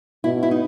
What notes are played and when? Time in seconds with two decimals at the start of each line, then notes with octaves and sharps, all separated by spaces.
0.24 B2 E4
0.43 E4
0.51 D#4